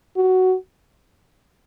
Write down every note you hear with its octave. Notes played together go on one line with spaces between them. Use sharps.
F#4